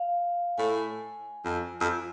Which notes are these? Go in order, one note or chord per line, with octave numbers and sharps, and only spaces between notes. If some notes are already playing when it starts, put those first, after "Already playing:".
Already playing: F5
A2 G#5
F2
F2